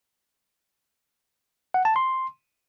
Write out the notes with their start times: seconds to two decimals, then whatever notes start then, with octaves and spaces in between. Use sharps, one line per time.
1.74 F#5
1.85 A5
1.96 C6